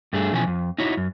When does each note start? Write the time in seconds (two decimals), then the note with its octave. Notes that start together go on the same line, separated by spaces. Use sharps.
0.13 G2 A3 D4 G#4
0.33 B2 E3 F3 C#4 G#5
0.47 F2
0.78 D#4 E4 F#4 C#5
0.97 F#2